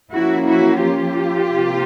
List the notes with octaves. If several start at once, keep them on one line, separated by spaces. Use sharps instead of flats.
F3 A#3 C#4 E4 F#4
E4 F#4
F4 G4
C3 F3 A#3